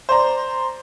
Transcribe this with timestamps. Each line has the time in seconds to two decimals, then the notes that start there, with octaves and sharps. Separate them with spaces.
0.09 C5 D5 A#5